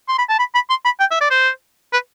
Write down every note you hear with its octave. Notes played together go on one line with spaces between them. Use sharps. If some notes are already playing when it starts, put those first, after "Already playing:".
C6
B5
A5
B5
B5
C6
B5
G5
E5
D5
C5
B4